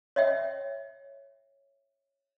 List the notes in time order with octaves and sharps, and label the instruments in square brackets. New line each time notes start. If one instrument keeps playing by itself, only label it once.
[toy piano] C#5 D#5 E5 G5